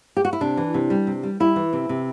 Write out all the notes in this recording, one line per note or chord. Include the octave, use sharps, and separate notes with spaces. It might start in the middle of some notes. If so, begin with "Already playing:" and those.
G4
F#4
E4
C3 D4
E3
C3
G3
C3
G3
G3 E4
E3
C3
C3